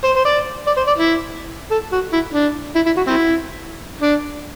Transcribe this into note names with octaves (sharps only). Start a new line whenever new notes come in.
C5
C5
D5
D5
C5
D5
E4
A4
F#4
E4
D4
E4
E4
F#4
C4 E4
D4